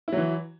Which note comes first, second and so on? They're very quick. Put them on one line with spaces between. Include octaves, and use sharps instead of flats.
E4 F#3 E3